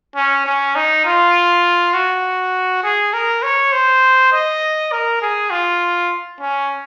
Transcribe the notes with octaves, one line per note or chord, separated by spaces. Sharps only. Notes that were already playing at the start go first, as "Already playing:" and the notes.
C#4
C#4
D#4
F4
F#4
G#4
A#4
C#5
C5
D#5
A#4
G#4
F4
C#4